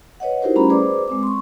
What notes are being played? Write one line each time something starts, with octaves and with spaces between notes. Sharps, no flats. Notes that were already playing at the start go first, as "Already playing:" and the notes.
B4 C#5 D#5 F#5
D#4 E4 F#4 G4 A#4 C5
G3 A3 C#4 G4 A#5 B5
G#4 B4 C5 D5 D6
G#3 C4 D6
C6 C#6